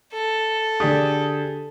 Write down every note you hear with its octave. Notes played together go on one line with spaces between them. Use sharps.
A4
D3 G4 G#4 D5 D#6